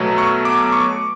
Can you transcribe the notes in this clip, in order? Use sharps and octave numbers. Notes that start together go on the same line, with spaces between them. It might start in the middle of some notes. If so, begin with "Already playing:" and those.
Already playing: B2 F#3 A3
C#6
D6
C#6